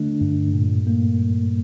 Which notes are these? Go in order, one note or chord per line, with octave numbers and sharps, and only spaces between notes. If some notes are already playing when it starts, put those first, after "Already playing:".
Already playing: D3 A3 D4
G2
A#2
A#3
G3